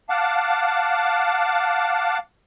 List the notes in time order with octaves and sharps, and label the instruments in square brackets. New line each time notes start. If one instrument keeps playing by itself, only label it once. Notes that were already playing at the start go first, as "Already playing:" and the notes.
[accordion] F5 F#5 A5 D6